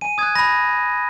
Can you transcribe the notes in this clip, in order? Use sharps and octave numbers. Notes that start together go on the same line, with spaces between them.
G#5 D#7
D#6 F#6 G#6
B5 A#6